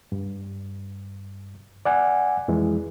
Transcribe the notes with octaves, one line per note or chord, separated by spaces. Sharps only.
G2
D5 F#5 G#5
F2 E3 G#3